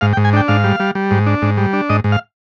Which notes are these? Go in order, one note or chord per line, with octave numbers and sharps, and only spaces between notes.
G#2 F5
G5
G#2
G#5
D4 G5
G#2 F5
G3
G3
G3
G#2
D4
G#2
G3
D4
G#2 D#5
G#2
F5